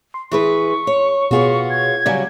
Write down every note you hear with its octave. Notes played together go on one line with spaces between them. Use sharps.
C6
E3 G#4 B4 C#6
C#5
B2 B3 F4 F#4 G#4 C#5
G#6
C#3 F#3 G3 D5 F5 G#5